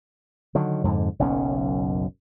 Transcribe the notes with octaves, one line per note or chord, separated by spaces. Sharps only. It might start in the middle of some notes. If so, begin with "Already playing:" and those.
D3 D#3 F#3
F2 G#2 D3
F#1 B1 F#2 C#4